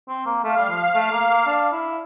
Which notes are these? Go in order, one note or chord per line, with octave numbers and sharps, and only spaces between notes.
C4
A#3
A3 F5
G3
F3
A3
A#3
A#3
D4
E4